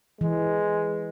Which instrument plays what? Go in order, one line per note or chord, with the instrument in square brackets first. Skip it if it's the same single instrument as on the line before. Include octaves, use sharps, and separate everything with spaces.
[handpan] E3 [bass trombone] G#3